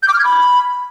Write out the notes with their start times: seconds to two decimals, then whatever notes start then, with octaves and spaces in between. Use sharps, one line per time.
0.03 G6
0.08 D6
0.14 F6
0.19 G#6
0.24 B5